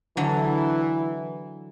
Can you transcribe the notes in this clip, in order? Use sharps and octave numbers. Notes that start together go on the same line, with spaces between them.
D3 E3 F#3